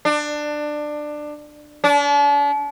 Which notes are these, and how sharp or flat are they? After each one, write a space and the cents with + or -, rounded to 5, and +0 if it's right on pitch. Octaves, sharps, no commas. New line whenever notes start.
D4 +20
D4 -40